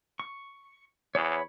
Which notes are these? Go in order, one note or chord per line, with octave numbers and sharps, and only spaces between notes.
C#6
E2 C#5 B5